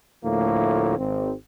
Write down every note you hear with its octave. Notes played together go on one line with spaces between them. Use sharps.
D2 A2 F3 A#3
G#1 C4